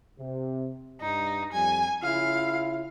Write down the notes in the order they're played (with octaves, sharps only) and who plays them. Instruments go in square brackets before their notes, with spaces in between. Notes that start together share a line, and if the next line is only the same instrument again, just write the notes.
[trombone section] C3
[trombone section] G2 [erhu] D#4
[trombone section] F2 G3 [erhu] G#5
[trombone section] C#3 E4 F4 [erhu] F5